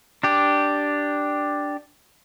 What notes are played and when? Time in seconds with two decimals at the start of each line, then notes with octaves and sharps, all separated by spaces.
0.23 D4 G4